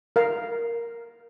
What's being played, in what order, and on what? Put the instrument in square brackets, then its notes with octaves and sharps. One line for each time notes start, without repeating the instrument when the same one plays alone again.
[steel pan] A#4 F5